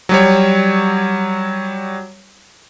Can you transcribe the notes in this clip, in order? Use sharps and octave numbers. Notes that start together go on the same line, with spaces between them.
F#3 G3 C#5